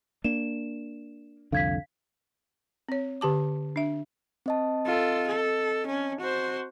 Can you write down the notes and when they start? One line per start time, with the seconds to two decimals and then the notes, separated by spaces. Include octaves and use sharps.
0.24 A#3 D4 E7
1.52 C2 F2 D3 F5 G#6 B6
2.89 C4 C#5
3.21 D3 G4 A5 D6
3.76 D4 E5
4.46 C4 D#5 A5
4.86 F4 A4
5.27 A4
5.87 C#4
6.21 F#4 C5